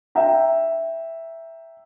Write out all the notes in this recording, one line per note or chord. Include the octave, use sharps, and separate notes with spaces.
E5 G5 A#5